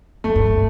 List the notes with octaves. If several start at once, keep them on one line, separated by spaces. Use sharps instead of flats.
F#2 A3
G2
A2